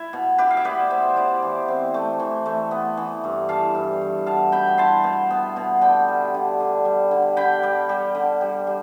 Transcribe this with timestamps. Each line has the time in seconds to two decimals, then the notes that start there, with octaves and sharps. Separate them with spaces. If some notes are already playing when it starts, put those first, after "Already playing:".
Already playing: E4
0.13 B2
0.38 E4 G4 B4
0.51 F5
0.57 E5
0.65 B3 B4 D5
0.90 B2 C5 E5
1.16 E4 D5 F5
1.42 E3
1.68 C4
1.94 A3
2.20 E3
2.46 A3
2.71 B3
2.97 E3
3.24 G2
3.49 E3 F5 A5
3.75 G2
4.01 E3
4.26 B2 F5 A5
4.52 B2 G5 B5
4.78 E4 A5 C6
5.04 B2
5.30 B3
5.56 B2
5.81 D3 G5 B5
6.08 G3
6.34 D3
6.60 D3
6.85 G3
7.11 D3
7.37 D3 G5 B5
7.63 G3
7.89 G3
8.15 D3
8.41 G3
8.67 G3